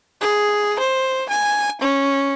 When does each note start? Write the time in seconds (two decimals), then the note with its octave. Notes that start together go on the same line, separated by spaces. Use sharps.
0.21 G#4
0.79 C5
1.29 G#5
1.82 C#4